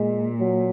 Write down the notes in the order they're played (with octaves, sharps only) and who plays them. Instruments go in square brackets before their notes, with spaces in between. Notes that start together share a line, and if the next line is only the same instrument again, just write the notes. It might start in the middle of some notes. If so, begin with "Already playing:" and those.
Already playing: [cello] A#2 [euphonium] G#3
[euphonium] F#3